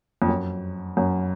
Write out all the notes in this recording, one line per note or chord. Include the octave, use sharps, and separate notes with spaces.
F2
F#2
F#2